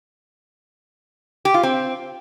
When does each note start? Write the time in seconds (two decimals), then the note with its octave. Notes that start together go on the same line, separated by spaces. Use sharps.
1.45 G4
1.54 F4
1.63 C4